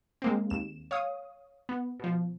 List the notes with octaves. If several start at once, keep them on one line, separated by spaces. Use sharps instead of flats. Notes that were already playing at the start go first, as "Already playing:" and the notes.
G#3 A#3 C4
D#2 E7
C#5 F5 D#6
B3
B2 F3